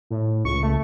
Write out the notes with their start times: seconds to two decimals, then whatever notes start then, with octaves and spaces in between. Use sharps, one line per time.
0.10 A2
0.45 C#2 C#6
0.63 A3